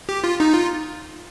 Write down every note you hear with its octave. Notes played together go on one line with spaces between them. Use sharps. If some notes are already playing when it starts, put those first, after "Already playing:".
G4
F4
D#4
F4